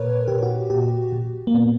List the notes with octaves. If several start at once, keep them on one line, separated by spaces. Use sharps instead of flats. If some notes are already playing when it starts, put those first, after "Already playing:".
Already playing: A#2 A#4 B4 C#5
A#2 G4
F#4
A#2 G4
A#2
A#3
A#2 B3